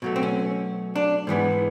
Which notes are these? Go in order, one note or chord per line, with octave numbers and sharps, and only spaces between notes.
B2 F#3 A3
C4
C#4
D4
G#2 E3 G#3 B3